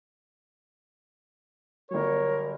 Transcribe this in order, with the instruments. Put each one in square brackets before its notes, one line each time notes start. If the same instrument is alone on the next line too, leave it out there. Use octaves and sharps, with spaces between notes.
[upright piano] G1 F#3 [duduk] A#4 [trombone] C#5